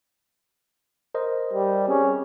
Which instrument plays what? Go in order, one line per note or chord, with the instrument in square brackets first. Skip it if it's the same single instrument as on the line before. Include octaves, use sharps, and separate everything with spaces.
[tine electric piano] A#4 C5 D#5
[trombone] G3
[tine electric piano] C4 G#4 [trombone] C#4